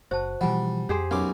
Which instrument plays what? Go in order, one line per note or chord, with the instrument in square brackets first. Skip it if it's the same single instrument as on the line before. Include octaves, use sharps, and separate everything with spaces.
[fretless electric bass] F#1 [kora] F#4 [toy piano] C5 A5
[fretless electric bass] B2 E3 F3 [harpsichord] G3 [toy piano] F#5 G#5
[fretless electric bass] F2 [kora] G4 G#4 C5
[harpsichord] B1 F#2 D6 [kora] C#4